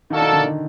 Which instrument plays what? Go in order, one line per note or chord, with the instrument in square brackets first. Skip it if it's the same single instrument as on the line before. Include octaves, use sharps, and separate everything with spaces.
[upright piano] D#3 [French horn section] A#3 F#4 A4 D5
[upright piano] D#3
D3
D#3